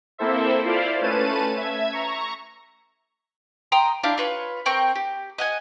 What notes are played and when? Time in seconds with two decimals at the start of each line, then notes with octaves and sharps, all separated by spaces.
0.18 A#3 C4 E4 A4 C5 E5
0.64 E4 F4 C5 D5 F5
1.01 A3 C#4 B4 A5 D#7
1.57 E5 G#6
1.92 A#5 C#6
3.72 G5 A#5 C6 D#6
4.03 D4 E4 G4 F5
4.18 F4 B4 C#5
4.66 C4 A#4 G5 C#6
4.95 G4
5.38 D#5 F#5 G#5